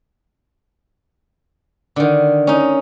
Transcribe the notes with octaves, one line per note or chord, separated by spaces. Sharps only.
D3 D#3
C#4 D#4